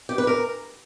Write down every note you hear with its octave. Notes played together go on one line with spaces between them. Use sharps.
G4
B4
A#4